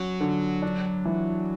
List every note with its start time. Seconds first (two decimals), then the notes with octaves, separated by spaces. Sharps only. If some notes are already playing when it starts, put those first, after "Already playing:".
Already playing: F#3 C#4
0.20 D3
0.62 D4
1.05 E3